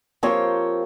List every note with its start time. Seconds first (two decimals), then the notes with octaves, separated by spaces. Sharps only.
0.23 F3 A#3 C4 F4 G4 C#5